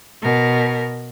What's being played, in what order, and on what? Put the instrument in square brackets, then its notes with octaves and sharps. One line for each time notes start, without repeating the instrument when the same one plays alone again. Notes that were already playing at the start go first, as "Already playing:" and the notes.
[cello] B2 A#4